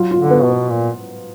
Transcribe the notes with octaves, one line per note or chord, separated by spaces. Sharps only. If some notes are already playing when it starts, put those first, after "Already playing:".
Already playing: F#3 F4
F4
D3
B3
B2
B3
A#2